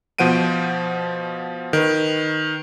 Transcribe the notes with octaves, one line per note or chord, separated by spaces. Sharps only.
B2 F3 C5 F#5 D7 D#7
D#3 B4